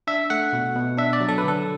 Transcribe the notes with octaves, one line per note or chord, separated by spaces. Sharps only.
D4 E5
A3 F#5
B2
B2
D4 E5
D5
F#3
A4
B4
D3 A4